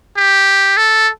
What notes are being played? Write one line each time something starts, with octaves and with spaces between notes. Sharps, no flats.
G4
A4